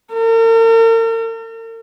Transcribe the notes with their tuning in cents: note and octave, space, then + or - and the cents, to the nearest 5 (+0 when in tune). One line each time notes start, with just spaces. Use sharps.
A#4 -40